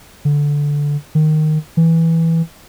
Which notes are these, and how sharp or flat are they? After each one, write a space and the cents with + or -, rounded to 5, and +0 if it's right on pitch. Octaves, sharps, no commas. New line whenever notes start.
D3 -10
D#3 -10
E3 -5